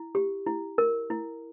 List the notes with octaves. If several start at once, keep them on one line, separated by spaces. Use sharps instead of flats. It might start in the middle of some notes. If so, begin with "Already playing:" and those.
Already playing: E4
G4
E4
A#4
E4